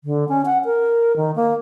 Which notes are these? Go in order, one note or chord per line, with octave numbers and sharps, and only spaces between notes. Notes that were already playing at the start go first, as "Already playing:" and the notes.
D3
C#4
F#5
A#4
D#3
A#3